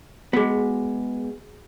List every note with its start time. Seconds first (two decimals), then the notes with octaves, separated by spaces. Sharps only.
0.33 G#3 B3 F#4 G#4